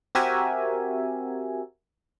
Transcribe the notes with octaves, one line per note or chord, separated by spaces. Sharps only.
C4 F#4 G4 A#4 E5 G#5